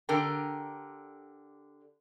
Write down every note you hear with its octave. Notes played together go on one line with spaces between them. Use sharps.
D3 G4 A#4 G5 A5